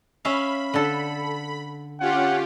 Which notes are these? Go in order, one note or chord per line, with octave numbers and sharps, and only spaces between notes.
C#4 E5 F5 B5
D3 A4
C#4 F4 G4 F#5